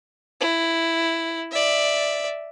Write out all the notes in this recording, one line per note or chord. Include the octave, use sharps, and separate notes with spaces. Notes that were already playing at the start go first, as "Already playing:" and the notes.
E4
D5 E5